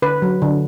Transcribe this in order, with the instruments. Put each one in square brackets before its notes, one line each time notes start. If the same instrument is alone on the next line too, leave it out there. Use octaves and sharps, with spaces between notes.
[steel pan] D3 B4
F#3
D3